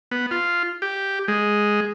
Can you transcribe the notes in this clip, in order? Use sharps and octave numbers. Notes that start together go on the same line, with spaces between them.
B3
F4
G4
G#3